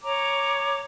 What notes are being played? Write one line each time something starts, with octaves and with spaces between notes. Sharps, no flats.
C#5 A#5 D6